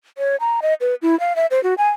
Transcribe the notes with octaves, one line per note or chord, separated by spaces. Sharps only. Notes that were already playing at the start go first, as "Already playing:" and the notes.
C#5
A#5
D#5
B4
E4
F5
E5
C5
F#4
G#5